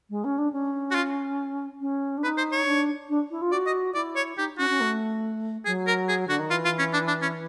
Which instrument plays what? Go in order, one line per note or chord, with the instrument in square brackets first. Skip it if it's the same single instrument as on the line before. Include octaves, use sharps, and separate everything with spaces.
[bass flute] G#3
C#4
D4
C#4
[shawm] F#4
F4
[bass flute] C#4
D4
[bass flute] D#4 [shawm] B4
[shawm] C5
C#5
[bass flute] D4
D4
E4
F4
[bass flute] F#4 [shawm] D5
[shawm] D#5
[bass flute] E4 [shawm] D5
[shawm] C#5
[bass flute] D#4 [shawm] G4
[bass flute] C#4 [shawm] F#4
[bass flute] C#4
A3
[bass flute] F#3 [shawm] G#4
[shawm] A#4
G#4
[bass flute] D3 [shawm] F#4
[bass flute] D#3
[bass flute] E3 [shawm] F4
[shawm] F4
C#4
D4
D4
C#4